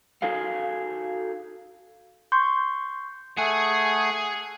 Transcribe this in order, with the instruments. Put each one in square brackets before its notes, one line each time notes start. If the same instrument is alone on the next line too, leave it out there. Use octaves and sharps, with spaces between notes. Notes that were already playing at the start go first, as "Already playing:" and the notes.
[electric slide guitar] D#4 F#4 G#4 A4 F5
[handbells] C6 C#6 G6
[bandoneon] A3 F#5 [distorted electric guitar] G#4 G#5